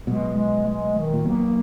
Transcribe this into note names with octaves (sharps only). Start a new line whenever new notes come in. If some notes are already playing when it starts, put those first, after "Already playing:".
B1 B2 G#3
G#3
G#3
D#3
A#2
B1 B2 A#3